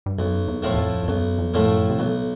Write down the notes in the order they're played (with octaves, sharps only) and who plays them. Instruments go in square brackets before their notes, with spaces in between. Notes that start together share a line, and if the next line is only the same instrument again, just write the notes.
[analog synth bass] G2
[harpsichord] B1 [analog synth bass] F#2
[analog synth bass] E2
[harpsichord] A2 F3 A3
[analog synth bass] E2
F2
F2
[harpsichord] B1 [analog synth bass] F#2
[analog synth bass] F2
[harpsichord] A2 F3 A3
[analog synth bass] F#2
C3
[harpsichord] B1 [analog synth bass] B2